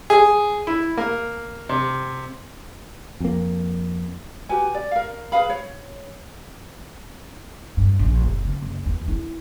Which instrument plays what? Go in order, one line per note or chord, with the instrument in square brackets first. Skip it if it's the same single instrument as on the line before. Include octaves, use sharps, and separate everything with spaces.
[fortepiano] G#4
E4
A#3
C3
[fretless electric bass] F2 A#3
[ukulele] F#4 G4 B4 G#5
D5
A#4 F5
G#4 B4 F5 B5
C#5
[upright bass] G2
A#1
F#1
C#3
F#1
E2
E4